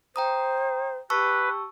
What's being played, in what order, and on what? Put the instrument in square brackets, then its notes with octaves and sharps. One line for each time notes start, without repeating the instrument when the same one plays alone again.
[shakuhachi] C5 [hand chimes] G5 A#5 D#6
[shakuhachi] G4 [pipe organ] B4 [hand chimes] A5 C#6 E6